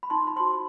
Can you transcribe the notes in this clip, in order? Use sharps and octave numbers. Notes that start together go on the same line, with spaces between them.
B5
D#4 A5 C6
B5
F#4 C5 A5 C6